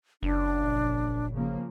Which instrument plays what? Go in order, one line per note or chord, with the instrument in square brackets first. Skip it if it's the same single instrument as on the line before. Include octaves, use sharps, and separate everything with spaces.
[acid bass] F#1 [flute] D4
[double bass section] A#1
C#3 F3 A#3